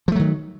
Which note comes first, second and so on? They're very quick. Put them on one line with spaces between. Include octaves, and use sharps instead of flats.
F3 A3 F#3 D#3